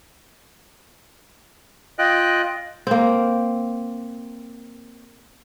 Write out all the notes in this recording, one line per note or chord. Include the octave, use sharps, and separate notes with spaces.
F4 D#5 G5 F#6
A#3 C4